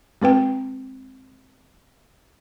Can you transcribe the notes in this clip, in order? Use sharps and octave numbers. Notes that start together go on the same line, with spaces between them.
G#3 C4 B4 G5